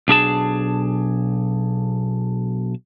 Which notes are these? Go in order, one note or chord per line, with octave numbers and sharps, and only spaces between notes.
B1 D4 G#4 A5